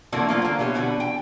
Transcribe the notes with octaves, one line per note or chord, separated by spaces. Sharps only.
E3 F3 A3 A#3 D4 F#4
F#3 A#3 F4 C5
D3 A#3
B2 E3 G4 C#5
B2 D3 F#4 B4
G5